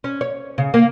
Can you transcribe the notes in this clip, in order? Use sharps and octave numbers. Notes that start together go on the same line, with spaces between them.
C#4
C#5
C#3
A#3